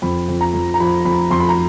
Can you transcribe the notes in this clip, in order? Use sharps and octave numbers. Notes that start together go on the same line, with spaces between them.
F2 B5
F2
A#5
F2
A#5
F3 B5
F2 B5
F2 C6
B5
A#5